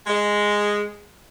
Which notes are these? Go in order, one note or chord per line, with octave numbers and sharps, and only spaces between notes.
G#3